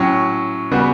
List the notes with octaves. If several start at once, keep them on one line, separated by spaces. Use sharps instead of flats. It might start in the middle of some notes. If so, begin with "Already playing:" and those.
Already playing: A2 F#3 C#4
C#3 G3 B3 F#4